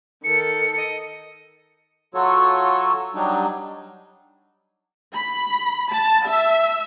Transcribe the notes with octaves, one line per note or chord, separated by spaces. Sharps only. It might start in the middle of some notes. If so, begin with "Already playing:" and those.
D#3 A4 C#7
D#5
F#3 F4 F#4 A4 C#5
F#3 G3 D4 D#4
B5
A5
E5